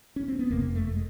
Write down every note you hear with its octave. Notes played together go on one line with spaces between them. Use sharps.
C#4
C4
B3
F#1 F2 C3 A#3
A3
G#3